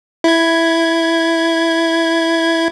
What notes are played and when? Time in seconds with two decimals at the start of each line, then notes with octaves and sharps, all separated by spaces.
0.24 E4 G#6